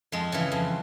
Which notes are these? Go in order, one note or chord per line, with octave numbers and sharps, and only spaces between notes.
F2 G#3
C#3 E3
F2